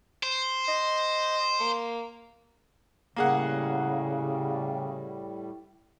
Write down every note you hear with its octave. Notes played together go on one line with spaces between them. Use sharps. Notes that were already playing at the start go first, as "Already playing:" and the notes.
C5
D#5
A#3
A2 C#3 G3 A#3 G#4 F#5